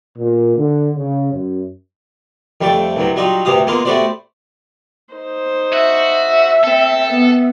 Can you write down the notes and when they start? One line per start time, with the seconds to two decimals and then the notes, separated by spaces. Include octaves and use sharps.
0.17 A#2
0.56 D3
0.96 C#3
1.32 F#2
2.61 F2 G3 A3 G5 A5
2.96 C2 G2 F#3
3.16 F#3 G3 D#4 F4
3.45 D2 G2 C3 G4 F5 D#6
3.67 G#3 A#3 B3 F4 A#4
3.85 A3 B3 F#4 G4 C5 D5
5.14 D#4 C5
5.73 F#4 E5
6.64 C4 A4
7.10 B3